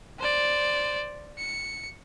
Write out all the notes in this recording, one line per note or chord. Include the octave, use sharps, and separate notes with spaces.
C5 D5
C#7